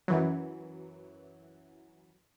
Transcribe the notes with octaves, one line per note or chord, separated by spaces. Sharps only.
F#2 E3 F#3